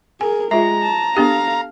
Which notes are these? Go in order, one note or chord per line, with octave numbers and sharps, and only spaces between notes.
G#4 A#4 G#5
G#3 F4 E5 A#5
A5
B3 D4 G4 A4 F5